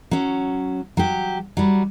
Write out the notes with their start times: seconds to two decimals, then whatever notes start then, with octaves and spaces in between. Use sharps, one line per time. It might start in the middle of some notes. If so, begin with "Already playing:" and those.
0.11 F#3 C#4
0.97 F#3 G4
1.57 F#3 G3